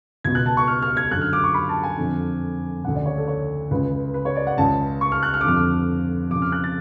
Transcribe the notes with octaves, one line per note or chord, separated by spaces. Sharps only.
C#2 B2 G#6
F#6
A5
C#6
F6
F6
G#6
F#2 D3 F#6
F6
D6
C#6
B5
A5
G#5
F2 D3
D2 C#3 F#5
D5
C#5
A4
C#5
C#2 C#3 B4
B4
C#5
D5
F#5
C#2 C#3 A5
C#6
F6
F#6
F6
D6
F2 D3 F6
F2 C#3 D6
F6
F#6
A6